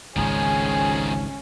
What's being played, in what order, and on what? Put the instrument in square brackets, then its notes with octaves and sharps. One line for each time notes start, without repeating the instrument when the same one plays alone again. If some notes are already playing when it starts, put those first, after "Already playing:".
[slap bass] G#1 C#2 G#2 [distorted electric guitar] D#3 F3 [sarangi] C#4 [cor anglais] G#4